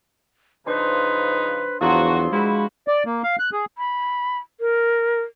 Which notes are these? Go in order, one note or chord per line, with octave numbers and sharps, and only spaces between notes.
C#3 F3 D4 D#4 B4 C5 C6
E2 F3 F#3 D4 F#4 C6
G#3 E4 F#4 F5 B5
D5
A#3
F5
F#6
G#4
B5
A#4